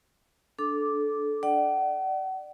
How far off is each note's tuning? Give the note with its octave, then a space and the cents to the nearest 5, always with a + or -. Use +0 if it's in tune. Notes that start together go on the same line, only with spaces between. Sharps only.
D4 +0 A4 -20 D6 -5
D5 +25 F#5 +40